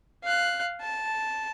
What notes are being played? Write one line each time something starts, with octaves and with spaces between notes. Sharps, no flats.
F5 F#6
A5